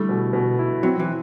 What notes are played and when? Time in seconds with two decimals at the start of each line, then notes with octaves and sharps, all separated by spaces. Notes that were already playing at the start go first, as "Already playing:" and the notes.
Already playing: D3 G3 A3 E4
0.09 B2
0.33 B2
0.59 E4
0.83 F#3 C4
1.00 E3